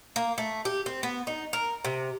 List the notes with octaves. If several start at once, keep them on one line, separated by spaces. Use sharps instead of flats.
A#3
A3
G4
C4
B3
D#4
A#4
C3